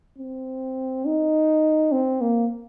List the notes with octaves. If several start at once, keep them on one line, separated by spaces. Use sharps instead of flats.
C4
D#4
C4
A#3